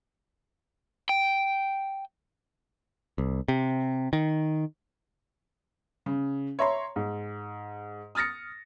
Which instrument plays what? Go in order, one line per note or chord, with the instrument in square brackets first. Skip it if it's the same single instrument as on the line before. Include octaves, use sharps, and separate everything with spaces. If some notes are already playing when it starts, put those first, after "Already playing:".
[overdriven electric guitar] G5
[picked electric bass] C2
C3
D#3
[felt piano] C#3
C#5 E5 A#5 C6
G#2
D#6 F6 A6 A#6 C#7